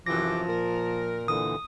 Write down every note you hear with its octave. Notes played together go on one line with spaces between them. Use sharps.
F#2 C3 E3 F3 D6 A#6
A#2 A#4
A#2 D3 E3 D#6